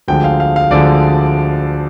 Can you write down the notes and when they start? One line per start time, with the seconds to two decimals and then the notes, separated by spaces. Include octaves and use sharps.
0.08 D2 D3 F3 G#3 G5
0.24 F5
0.40 F5
0.56 F5
0.71 D2 D3 F3 G#3 D5